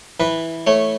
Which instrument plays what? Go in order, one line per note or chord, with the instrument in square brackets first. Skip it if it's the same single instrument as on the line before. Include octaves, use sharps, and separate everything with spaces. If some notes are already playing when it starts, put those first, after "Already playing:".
[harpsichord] E3 B4
A3 C#5